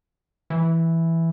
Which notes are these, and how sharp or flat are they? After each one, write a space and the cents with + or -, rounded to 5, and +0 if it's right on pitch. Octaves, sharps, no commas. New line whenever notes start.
E3 +0